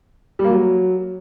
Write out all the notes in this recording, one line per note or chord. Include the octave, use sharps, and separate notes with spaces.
G3
A#3
F#3